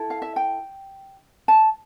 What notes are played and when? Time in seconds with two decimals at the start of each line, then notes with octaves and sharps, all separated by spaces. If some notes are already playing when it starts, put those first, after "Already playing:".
Already playing: E4 A4
0.10 F5
0.22 E5
0.36 G5
1.48 A5